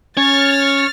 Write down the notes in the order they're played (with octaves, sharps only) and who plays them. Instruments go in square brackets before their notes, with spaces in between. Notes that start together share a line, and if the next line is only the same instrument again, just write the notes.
[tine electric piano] C#4 [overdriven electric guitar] C#5 [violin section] F6 A6